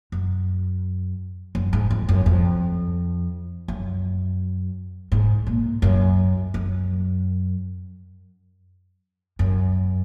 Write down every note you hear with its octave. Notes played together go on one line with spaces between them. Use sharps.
F#2
F#2
G#2
F2
F#2
F2
F#2
G#2
A#2
F#2
F#2
F#2